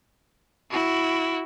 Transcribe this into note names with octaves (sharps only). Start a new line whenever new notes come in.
E4 F#4